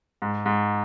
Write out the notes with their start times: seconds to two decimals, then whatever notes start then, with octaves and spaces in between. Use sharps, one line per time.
0.22 G#2
0.46 G#2